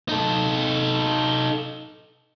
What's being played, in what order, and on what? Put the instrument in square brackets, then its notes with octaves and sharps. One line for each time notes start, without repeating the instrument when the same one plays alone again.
[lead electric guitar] D#4 A4